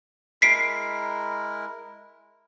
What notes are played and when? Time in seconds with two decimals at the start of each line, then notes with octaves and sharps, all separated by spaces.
0.42 G#3 E4 A#4 B6 C7 D7